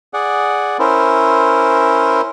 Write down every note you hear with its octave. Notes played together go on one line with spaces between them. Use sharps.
G#4 D5 F#5
C#4 E4 A#4 C5